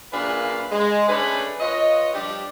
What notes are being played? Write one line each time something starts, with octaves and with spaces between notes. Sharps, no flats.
F#2 A#2 D4 G#4 B4 F5
G#3
A3 C#4 D4 G#4 B4
F4 B4 C#5 D#5
F3 G3 D4 G4